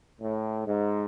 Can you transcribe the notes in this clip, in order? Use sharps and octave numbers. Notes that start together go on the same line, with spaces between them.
A2
G#2